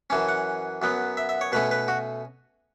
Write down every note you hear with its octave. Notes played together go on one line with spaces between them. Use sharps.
F#2 E3 C#4 A5
F#5
F#2 F#3 B3
E5
E5
C#5
B2 A3 C#4 B4
B4
F#4